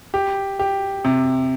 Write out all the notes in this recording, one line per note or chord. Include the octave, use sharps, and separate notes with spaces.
G4
G4
C3